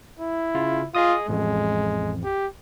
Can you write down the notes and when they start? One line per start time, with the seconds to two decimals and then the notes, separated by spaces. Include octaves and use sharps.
0.19 E4
0.55 C#3 F4
0.95 F4 G#4 D#5 D#6
1.28 A1 F2 G#3
2.24 G4